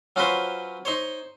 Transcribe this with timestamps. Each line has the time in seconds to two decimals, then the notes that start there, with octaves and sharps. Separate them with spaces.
0.16 F#3 C#4 F4 F#4 B4 C5
0.85 D#4 C5 C#5